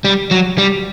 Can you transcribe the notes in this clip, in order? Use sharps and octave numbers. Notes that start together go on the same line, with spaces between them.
G3
F#3
G3